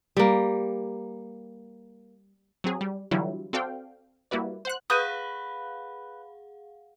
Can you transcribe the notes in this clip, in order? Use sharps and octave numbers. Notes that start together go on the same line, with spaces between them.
G3 A#3
F#3 C4 G#4
G3
D3 E3 F#3 G3 E4 F4
C4 F#4 A4 D5 F5 G5
G3 A#3 E4 F#4 B4 D5
C5 F#5 F#6
G#4 B4 F5 F#5 D#6 G6 D#7